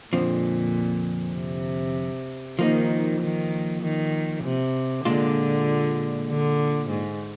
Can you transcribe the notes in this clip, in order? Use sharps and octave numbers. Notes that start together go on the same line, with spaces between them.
F2 A#2 D3 F3 C4
C3
D#3 F3 A#3 D#4
D#3
D#3
C3
A#2 D3 G#3 D4 F4
D3
G#2